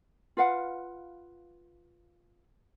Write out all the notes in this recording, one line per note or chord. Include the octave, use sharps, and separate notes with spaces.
F4 B4 F5 F#5